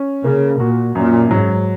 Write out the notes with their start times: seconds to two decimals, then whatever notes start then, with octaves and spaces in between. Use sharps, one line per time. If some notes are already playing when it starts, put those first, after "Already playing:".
Already playing: C#4
0.24 C#3 A#3
0.60 A#2 F#4
0.95 F#2 A#2
1.31 G#2 F#3